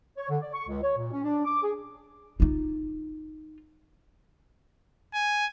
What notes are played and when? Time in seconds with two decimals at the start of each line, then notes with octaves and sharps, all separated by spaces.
0.17 C#5
0.29 D3
0.41 D5
0.54 C#6
0.68 C#2
0.83 C#5
0.98 A#2
1.12 C#4
1.24 D4
1.45 D6
1.63 G#4
2.40 D#4 F4
5.14 G#5